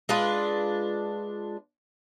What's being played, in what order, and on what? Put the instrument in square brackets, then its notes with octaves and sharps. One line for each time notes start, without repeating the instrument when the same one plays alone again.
[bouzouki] G#3 D4 F4 B4